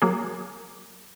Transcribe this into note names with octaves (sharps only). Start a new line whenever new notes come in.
F#3 A#3 G#4